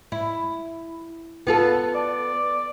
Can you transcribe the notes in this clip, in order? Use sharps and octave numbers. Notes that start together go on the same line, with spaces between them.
E4
B3 F4 A4
D5